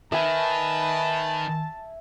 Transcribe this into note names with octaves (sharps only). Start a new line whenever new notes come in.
D#3 B4 E5 G#5 A5